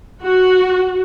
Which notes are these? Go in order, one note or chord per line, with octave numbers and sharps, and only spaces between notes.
F#4